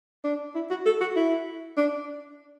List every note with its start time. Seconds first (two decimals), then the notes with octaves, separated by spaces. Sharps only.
0.24 D4
0.55 E4
0.70 F#4
0.86 A4
1.01 F#4
1.16 E4
1.77 D4